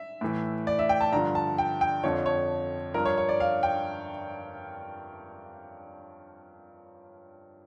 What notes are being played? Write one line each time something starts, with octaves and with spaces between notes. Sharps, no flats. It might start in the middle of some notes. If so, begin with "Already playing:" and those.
Already playing: E5
A2 E3
D5
E5
G5
A5
G2 D3 F3 A#5
A5
G5
G5
F2 D3 F3 C#5
C#5
G2 F3 A#4
C#5
C#5
D5
F5
G5